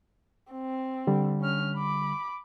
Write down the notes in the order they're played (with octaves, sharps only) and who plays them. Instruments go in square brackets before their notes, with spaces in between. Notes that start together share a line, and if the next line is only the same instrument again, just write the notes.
[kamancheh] C4
[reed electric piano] D3 G3
[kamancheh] C#4 F6
B5 D6